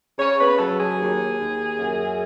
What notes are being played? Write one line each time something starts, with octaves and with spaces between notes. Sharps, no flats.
C#3 C#5
B4
F#3 A4
G#4
D#2
D#2
F#2